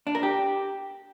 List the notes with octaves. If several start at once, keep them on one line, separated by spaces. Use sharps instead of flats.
D4
A#4
G4